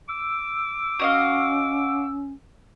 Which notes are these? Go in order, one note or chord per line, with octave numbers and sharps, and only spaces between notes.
D6 E6
C#4 F#4 D#5 F5